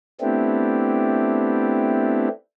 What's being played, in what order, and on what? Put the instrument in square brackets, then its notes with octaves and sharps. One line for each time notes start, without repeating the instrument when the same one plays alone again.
[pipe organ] A3 B3 C4 D4 E4 G4